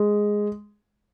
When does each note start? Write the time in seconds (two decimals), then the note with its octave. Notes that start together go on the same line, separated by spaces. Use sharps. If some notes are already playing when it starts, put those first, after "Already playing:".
Already playing: G#3